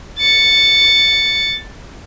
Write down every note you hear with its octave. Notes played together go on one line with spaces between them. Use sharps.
A6 C#7